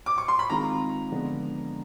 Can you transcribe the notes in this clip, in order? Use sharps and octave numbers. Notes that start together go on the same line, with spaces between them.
D6
C#6
C6
B5
D#3 G#3 C4 F4 G#4 A#5
D3 F3 G#3 B3